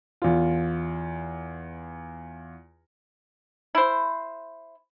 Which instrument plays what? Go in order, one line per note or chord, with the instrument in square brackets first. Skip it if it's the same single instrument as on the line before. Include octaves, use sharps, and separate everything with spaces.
[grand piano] E2 F4
[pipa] E4 C5